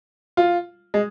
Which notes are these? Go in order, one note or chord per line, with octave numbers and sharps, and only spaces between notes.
F4
G#3